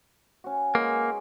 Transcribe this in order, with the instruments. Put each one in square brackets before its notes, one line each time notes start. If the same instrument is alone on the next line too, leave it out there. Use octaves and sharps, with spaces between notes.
[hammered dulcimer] C#4 F#4
[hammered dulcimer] G#3 B4 C#5 [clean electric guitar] A#3